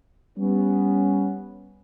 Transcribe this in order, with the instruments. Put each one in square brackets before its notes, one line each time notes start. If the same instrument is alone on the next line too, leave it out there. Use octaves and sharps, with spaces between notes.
[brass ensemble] G3 B3 C#4